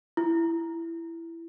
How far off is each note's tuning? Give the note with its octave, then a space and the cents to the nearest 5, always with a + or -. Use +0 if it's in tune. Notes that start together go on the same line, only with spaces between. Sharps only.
E4 +15